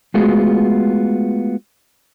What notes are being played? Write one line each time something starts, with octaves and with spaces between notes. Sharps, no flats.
G#3 A3 B3 F4 F#4 G#4